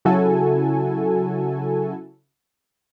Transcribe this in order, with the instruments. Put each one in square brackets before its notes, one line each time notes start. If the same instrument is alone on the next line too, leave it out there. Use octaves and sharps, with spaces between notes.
[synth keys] C#3 F#3 E4 F#4 A4 G#5